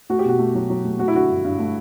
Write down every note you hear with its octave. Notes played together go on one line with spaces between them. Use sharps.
A3 F#4
G4
B2 F#4
A3
F#3
F#3
A3
A3 F#4
E4
D3 F#4
G2
G2
A3